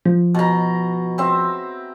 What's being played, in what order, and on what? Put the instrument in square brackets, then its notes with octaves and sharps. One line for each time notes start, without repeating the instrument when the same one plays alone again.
[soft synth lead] F3
[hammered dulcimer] B2 A#5
C4 E5